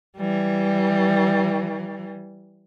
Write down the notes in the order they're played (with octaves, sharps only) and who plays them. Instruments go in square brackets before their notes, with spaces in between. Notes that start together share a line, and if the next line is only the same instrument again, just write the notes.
[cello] E3 G3